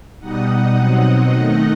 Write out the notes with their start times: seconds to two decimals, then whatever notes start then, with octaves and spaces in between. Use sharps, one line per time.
0.19 B2 G3 D#4 D#5 F#5
0.48 D#5 F#5
0.76 B2 F#3 C4 D#4
1.32 D#3 A3 D#4 D#5 F#5